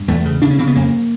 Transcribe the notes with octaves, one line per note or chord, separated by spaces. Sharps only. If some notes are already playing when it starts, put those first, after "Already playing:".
Already playing: G2
E2 A3
C#3
C#3 D4
C#4
C#3 C4
B3
F2 A#3